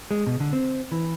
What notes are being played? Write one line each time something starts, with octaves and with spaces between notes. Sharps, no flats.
G#3
B2
D3
C4
E3